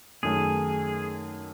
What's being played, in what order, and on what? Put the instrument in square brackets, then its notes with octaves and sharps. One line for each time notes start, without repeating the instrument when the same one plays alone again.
[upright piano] F#2 D#3 A3 [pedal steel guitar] G#4